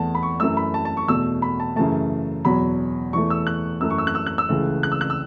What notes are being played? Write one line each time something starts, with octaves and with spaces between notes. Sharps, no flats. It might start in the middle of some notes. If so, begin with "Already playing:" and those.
Already playing: E2 E3 A3 F#5 A5
B5
C#6
F#2 E3 A3 E6
B5
A5
A5
C#6
E2 B2 A3 E6
B5
A5
F#2 C#3 E3 A3 A5
E2 B2 F#3 B5
E2 E3 A3 C#6
E6
F#6
F#2 E3 A3 E6
C#6
E6
F#6
E6
F#6
E6
C#2 C#3 E3 A3
F#6
E6
F#6
E6